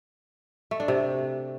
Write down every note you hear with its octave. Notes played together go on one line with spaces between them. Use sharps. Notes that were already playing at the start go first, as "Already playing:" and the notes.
A3
D4
C3